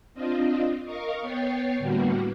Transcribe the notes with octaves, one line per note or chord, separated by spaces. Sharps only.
C4 D4 F4 D#5
A#4 D#5 F5 C#6
B3 C#5 G5 A6 C7
A2 D3 G3 A#3 B3 F#4